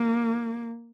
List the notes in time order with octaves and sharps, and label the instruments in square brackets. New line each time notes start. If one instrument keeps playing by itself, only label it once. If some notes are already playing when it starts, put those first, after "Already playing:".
Already playing: [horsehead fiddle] A#3